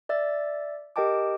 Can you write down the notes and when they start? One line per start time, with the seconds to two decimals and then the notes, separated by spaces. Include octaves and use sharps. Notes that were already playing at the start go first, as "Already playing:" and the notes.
0.09 D5 E5 E6 A6
0.96 G4 A#4 D#5 G5 A5 D6